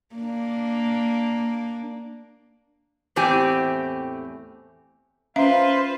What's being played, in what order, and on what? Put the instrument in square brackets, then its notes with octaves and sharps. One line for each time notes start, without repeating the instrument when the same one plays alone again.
[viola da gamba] A#3 D4
[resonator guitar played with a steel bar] E2 A2 C4 G4 G#5
[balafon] C#4 E5 F5 [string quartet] F4 B4 C5